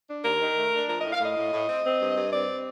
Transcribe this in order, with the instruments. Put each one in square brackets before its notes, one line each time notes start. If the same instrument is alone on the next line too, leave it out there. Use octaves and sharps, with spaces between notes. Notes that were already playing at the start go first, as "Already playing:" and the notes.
[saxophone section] D4
D#2 A#4
D#3
A3
D4
F3 A#4
A2 D#5
F5
A2 D#5
A2
A2
C4
C4
G2
G2
C4 D5